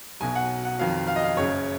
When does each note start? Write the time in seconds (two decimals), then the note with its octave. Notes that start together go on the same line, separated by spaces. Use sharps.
0.20 B1 B2 F#3 G#5
0.35 F#5
0.65 F#5
0.78 F2 D#3 F#3 F5
1.07 F5
1.16 D#5
1.23 F5
1.37 F#1 F#2 C#3 C#5